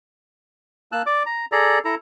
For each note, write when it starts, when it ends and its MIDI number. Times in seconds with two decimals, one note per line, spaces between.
0.92 1.02 58
0.92 1.02 81
0.92 1.02 88
0.92 1.02 90
1.06 1.23 74
1.06 1.23 86
1.26 1.46 82
1.52 1.79 68
1.52 1.79 69
1.52 1.79 74
1.52 1.79 82
1.85 1.95 64
1.85 1.95 69
1.85 1.95 82